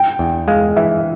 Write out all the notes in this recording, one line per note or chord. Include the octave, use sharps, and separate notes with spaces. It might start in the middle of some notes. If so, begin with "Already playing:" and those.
Already playing: G5
E2
G#3 F5
E3 E5